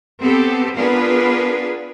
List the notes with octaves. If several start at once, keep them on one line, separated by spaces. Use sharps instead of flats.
B3 C4 G4 A4
B3 D4 F4 G#4 A#4 B4